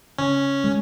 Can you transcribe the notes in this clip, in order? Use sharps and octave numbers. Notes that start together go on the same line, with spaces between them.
C#3 C#4
G#3